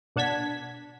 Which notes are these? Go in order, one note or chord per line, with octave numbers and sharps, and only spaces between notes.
B2 D4 F#5 A5 G#6 B6